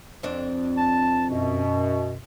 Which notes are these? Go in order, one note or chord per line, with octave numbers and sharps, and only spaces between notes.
F2 C4 D4
A5
F#2 B2